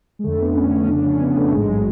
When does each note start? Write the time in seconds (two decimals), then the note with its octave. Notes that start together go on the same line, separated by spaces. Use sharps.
0.19 G#3
0.24 F2 D3 A3
0.41 B3
0.56 C#4
0.71 C#4
0.84 C#4
0.88 F2 C#3 D4
1.05 C#4
1.20 B3
1.36 A3
1.52 A1 G#2 G#3
1.68 F#3